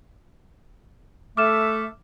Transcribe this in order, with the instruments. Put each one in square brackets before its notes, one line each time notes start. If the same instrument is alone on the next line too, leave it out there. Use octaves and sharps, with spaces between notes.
[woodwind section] A3 A4 E5 [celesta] D6 F6 E7